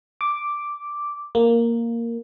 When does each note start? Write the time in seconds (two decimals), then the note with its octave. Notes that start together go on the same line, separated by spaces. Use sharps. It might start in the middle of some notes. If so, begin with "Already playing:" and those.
0.21 D6
1.35 A#3